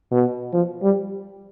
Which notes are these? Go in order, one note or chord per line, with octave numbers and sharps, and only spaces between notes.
B2
F3
G3